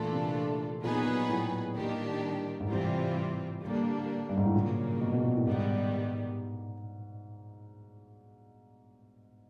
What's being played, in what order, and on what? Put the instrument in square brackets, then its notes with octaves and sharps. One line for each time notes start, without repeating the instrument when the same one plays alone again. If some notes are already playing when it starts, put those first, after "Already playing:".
Already playing: [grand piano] A#2 [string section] E3 A3 D4 F4 A4
[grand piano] C3
[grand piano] A#2 [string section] F#3 B3 D#4 G#4 B4
[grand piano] A#2
A2
[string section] D#3 G3 A#3 D4 G4
[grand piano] G#2
[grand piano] A2 [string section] C3 E3 G3 C4 F4
[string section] D3 G3 A#3 D4
[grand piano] G2
G#2
A2
[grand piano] A#2 [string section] C#3 F#3 A#3
[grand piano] B2
B2
A#2
A2
[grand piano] G#2 [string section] D#3 G3 B3